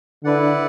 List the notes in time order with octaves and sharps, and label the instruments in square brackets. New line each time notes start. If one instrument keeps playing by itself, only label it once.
[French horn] D3 [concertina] E4 B4 D5 F#5